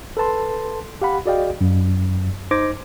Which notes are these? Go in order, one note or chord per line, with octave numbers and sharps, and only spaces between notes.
A4 B4 A5 C6
G4 F5 F#5 B5
F#4 G#4 D5 D#5 F5 G5
F#2
D#4 C5 D6 G#6 A#6